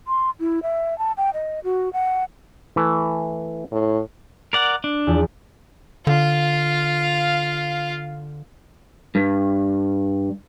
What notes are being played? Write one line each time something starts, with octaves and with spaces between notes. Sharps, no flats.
C6
E4
E5
A5
G5
D#5
F#4
F#5
E3 A3
A2
A#4 D5 F#5
D4
E2 F3
D3 F4 F5
G2